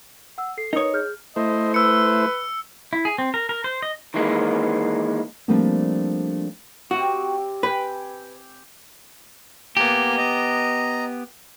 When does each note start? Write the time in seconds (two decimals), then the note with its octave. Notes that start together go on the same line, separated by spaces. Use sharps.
0.38 F#5 E6
0.58 A4 C7
0.73 D#4 A#4 B4 C#5 D#6
0.93 G#4 F6 G6
1.36 A3 E4 C5 D#5
1.74 B4 E6 C#7
2.93 E4
3.05 G#4
3.18 C4
3.34 A#4
3.49 A#4
3.64 C5
3.82 D#5
4.14 D#3 E3 G#3 A#3
5.48 F3 G3 A3 A#3 C4 D4
6.91 C3 C4 F#4
7.63 B4 G5 G#5
9.77 A#3 B3 G4 G#5 A#5
10.17 D#5 A#5